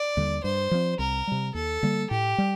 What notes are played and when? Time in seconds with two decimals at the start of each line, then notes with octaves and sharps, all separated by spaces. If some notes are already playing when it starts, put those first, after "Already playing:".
Already playing: D5
0.17 D#2 D3 G3
0.44 G2 C5
0.71 F3 C4
0.99 C2 A#4
1.27 C3 G3
1.54 D#2 A4
1.83 D3 G3 A#3
2.10 A2 G4
2.38 G3